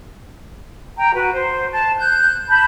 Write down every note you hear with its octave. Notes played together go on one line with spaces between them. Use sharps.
G5 A#5
F#4 B4
C5
A5
F#6 G6
A5 B5 G6